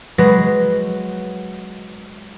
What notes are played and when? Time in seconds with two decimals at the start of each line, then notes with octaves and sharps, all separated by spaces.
0.18 F#3 G#3 B4 A#6